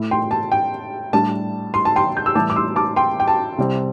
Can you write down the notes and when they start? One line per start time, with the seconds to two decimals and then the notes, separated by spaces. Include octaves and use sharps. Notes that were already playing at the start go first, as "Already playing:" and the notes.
Already playing: A2 A3 E4
0.11 G5 C6
0.31 A5
0.52 G5
1.13 A2 G3 D4 A5
1.74 C6
1.85 A5
1.96 G5 C6
2.17 G6
2.26 E6
2.35 A2 E3 G3 E4 A5 D6
2.50 D6
2.56 C6 E6
2.76 A5 D6
2.96 G5 C6
3.20 G5
3.28 A5
3.58 C2 C3 G3 C4